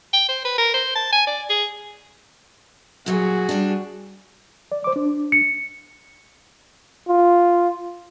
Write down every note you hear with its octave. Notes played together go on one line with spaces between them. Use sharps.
G5
C5
B4
A#4
C5
A5
G#5
D5
G#4
A#2 F#3 F#4 G#4
G3 D4
D5
C5 D6
D4
C#7
F4